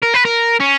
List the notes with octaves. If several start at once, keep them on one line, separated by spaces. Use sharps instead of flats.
A#4
B4
A#4
C#4